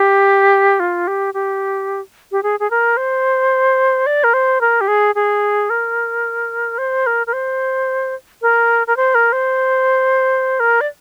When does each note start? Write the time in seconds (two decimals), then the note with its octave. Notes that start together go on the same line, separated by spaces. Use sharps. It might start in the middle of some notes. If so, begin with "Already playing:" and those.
Already playing: G4
0.80 F4
1.07 G4
1.34 G4
2.32 G4
2.43 G#4
2.60 G#4
2.71 A#4
2.97 C5
4.06 D5
4.24 A#4
4.34 C5
4.61 A#4
4.81 G4
4.88 G#4
5.15 G#4
5.70 A#4
6.78 C5
7.07 A#4
7.27 A#4
7.33 C5
8.42 A#4
8.87 A#4
8.97 C5
9.15 A#4
9.33 C5
10.60 A#4
10.81 D5